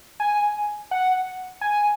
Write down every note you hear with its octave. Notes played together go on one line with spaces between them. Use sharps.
G#5
F#5
G#5